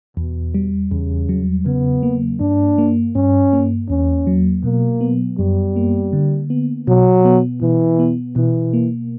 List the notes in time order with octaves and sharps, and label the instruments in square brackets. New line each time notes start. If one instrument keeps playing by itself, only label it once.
[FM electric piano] E2 [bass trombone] B2
[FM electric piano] G3
[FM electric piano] E2 [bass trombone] C#3
[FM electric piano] F#3
[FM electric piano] C#3 [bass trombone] B3
[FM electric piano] A#3
[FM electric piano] G2 [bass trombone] D4
[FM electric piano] A#3
[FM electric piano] G2 [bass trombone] C#4
[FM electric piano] A#3
[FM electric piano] E2 [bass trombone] C#4
[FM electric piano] F#3
[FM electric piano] B2 [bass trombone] A#3
[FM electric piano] B3
[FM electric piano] F#2 [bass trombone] G3
[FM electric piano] A#3
D3
B3
[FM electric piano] B2 [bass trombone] F#3
[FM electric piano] B3
[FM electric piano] B2 [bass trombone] E3
[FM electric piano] B3
[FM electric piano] B2 [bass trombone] E3
[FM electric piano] A#3